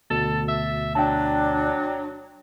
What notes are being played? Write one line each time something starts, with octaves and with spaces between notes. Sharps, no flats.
D2 B2 A4 A6
E5
F#3 D4 G5 A5